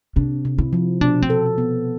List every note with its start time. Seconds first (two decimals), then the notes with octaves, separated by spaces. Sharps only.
0.16 C3 D4
0.45 C3
0.58 E4
0.73 F3
1.01 B2 D4
1.22 C4
1.30 A4
1.58 B3